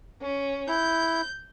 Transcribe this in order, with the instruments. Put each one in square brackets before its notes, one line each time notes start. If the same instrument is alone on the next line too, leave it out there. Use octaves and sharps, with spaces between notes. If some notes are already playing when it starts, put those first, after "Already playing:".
[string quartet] C#4
[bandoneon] E4 [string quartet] G6